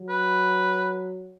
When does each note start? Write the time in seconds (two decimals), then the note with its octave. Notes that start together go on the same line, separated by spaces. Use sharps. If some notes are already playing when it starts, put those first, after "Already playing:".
Already playing: F#3
0.09 B4